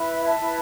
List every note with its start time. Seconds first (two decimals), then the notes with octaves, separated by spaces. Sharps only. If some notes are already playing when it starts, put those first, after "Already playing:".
Already playing: E4 B4
0.13 E5
0.26 E5 A5
0.40 E4 B4